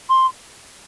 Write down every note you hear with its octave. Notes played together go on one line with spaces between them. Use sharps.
C6